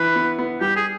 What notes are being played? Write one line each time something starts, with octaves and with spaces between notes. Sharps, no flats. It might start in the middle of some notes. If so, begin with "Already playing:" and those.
Already playing: E3 B4
B3
B3
G3 G4
G#4